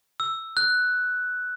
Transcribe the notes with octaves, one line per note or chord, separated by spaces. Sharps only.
E6
F#6